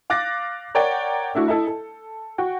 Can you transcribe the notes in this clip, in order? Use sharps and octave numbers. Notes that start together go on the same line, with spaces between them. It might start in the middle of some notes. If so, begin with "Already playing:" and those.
F5 D6 F#6 A6 A#6
A#4 C#5 D5 F#5 G5
A3 D4 E4 F#4
E4 A4 D#5 E5
A4
F#4 F#5 G5